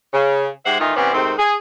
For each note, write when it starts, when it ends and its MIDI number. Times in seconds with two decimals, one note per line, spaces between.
0.13 0.47 49
0.65 0.80 44
0.65 0.80 56
0.65 0.80 67
0.65 0.80 72
0.65 0.80 76
0.65 0.80 78
0.80 0.92 51
0.80 0.92 52
0.80 0.92 57
0.80 0.92 63
0.80 0.92 65
0.96 1.13 48
0.96 1.13 52
0.96 1.13 59
0.96 1.13 61
0.96 1.13 72
0.96 1.13 74
1.13 1.32 44
1.13 1.32 48
1.13 1.32 51
1.13 1.32 57
1.13 1.32 60
1.38 1.54 68